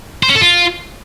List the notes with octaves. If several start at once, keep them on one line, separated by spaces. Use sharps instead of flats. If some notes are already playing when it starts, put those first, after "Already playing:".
C5
C#4
A4
F4